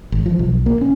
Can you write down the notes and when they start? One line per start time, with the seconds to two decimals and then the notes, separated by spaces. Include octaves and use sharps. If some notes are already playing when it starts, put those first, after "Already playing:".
0.12 G#1
0.26 F3
0.39 B1
0.66 A#3
0.81 C#4